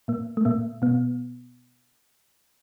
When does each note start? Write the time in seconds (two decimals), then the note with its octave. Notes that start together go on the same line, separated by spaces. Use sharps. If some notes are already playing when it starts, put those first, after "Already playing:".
0.08 A#2 A#3
0.37 A3
0.45 A#2 A#3
0.82 B2 B3